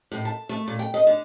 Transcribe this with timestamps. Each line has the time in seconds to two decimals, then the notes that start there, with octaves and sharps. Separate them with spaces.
0.12 A2
0.25 A5
0.49 A3
0.68 A#2
0.79 G5
0.94 D#5
1.07 D3